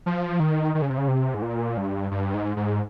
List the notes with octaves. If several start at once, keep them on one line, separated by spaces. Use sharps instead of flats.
F3
D#3
D#3
C#3
C3
C#3
C3
G#2
A#2
G2
G2
G#2
G#2